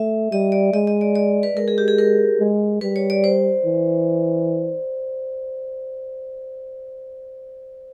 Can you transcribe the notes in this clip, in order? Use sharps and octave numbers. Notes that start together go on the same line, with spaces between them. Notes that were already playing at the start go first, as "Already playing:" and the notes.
Already playing: A3 E5
G3 D#5
D5
G#3 D#5
D#5
D5
D5
B4
G#3 A#4
G#4
G4
G#4
A#4
G#3
G3 B4
C#5
D5
C5
E3